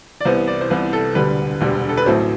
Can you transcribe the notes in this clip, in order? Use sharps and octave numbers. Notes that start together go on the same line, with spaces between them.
D5
C2 C3 E3 B3 C5
D5
C5
C2 C3 E3 B3 B4
A4
E1 D2 D3 G3 B4
E1 D2 D3 G3
A4
B4
A1 A2 F#3 A3 C4 C5